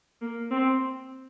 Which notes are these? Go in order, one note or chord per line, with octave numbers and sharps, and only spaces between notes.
A#3
C4